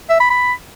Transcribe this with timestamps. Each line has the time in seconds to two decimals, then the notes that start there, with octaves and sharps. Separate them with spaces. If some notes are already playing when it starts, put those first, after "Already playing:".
0.10 E5
0.20 B5
0.31 B5